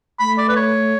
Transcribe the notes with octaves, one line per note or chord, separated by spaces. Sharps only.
A3 B5
D5
B4
C#5